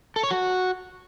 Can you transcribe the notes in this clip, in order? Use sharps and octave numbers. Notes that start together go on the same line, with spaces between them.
A4
C#5
F#4